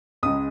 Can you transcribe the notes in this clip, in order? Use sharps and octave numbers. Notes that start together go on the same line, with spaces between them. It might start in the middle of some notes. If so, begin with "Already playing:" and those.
C#2 C#3 G#3 D#6